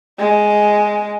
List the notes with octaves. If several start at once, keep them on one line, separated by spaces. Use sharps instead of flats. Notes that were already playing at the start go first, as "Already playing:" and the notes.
G#3